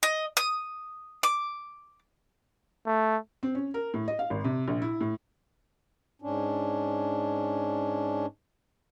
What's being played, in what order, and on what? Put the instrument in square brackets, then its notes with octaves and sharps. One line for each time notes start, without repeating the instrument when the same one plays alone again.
[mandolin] D#5
D#6
D6
[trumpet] A3
[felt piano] C4
C#4
A#4
A2
D#5
F5
G#1
C3
A#1
E4
A2
[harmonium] G#2 C#4 D4